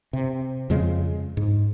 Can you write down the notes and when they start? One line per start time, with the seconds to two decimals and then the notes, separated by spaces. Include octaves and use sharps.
0.13 C3
0.70 F2 C#3 G#3
1.37 G#2